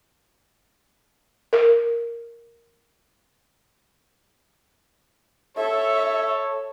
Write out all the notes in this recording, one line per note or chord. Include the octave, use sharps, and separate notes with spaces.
A#4
A4 C#5 E5